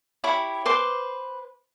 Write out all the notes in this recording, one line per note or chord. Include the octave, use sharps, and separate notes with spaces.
E4 G4 C#5 B5
B4 C5 C6 D6